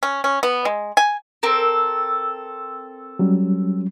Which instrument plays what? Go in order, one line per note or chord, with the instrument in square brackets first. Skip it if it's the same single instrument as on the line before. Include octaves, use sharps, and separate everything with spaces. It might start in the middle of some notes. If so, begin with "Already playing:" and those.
[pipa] C#4
C#4
B3
G#3
G#5
[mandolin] C4 A4 A#4
[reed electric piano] F#3 G3 C#4